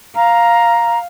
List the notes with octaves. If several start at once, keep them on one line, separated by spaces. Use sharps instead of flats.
F5 A#5